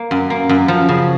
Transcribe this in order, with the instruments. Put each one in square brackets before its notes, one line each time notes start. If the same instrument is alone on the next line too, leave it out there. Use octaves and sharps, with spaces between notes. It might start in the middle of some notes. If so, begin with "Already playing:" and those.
Already playing: [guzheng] A#3
F#2
A#3
F#2
F3
C#3